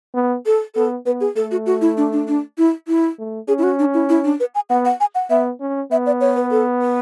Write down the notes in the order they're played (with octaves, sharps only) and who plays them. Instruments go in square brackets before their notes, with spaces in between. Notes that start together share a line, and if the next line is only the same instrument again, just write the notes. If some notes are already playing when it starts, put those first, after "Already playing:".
[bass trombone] B3
[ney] A4
[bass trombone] B3 [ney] A4
[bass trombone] B3 [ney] B4
[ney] G#4
[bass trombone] A3 [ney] A4
[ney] F#4
F#4
E4
D4
D4
D4
E4
E4
[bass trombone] A3
[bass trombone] C#4 [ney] G#4
[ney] E4
F#4
D4
E4
E4
D4
B4
G#5
[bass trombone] B3 [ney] F#5
[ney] F#5
G#5
F#5
[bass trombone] B3 [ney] E5
[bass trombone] C#4
[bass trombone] B3 [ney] E5
[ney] D5
C#5
B4
A4
B4